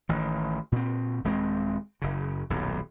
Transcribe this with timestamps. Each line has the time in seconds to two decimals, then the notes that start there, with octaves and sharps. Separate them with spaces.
0.09 A1 D#3
0.72 A#2 C4
1.24 D#1 G#3 A3 C4
2.02 F#1 C#3
2.50 D#1 B1 F#2